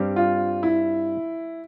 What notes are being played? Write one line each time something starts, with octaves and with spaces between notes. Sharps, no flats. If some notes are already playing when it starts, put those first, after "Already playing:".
Already playing: G2 G3 C4 G4
F4
E4